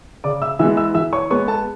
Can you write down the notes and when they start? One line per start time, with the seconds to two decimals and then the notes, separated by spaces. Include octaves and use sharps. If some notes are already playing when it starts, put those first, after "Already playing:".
0.24 C#3 D5 D6
0.42 E5 E6
0.59 E3 G#3 B3 E5 E6
0.77 E5 E6
0.95 E3 E5 E6
1.13 C#5 C#6
1.30 G#3 B3 C#5 C#6
1.48 A4 A5